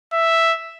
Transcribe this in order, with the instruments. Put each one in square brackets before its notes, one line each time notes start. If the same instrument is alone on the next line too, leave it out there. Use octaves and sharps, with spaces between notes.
[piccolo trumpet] E5